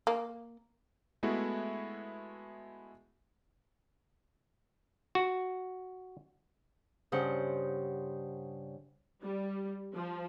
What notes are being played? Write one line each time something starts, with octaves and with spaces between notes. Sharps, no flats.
A#3
G#3 A3 B3 E4 F#4
F#4
G2 C#3 C5 F#5
G3
F3